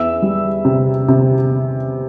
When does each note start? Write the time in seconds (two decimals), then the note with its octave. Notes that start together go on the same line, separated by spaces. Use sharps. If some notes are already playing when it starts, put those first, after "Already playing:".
Already playing: E2 E5 E6
0.22 G3
0.65 C3
1.08 C3